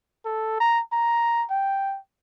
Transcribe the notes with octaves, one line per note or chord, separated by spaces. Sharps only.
A4
A#5
A#5
G5